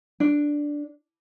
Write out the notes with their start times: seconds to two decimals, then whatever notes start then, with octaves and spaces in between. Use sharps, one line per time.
0.20 D4